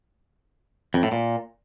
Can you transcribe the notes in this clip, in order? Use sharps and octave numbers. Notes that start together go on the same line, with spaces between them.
F2
A2
A#2